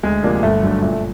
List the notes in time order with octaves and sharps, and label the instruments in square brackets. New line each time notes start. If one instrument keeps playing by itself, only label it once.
[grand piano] D2 [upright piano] G#3
[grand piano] C3 F3 A#3 D4
[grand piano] G1 [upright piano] A3
[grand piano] F#2 D3
[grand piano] A#2 [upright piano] A3
[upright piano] A3